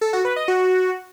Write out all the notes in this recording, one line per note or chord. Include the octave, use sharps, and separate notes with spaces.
A4
F#4
B4
D#5
F#4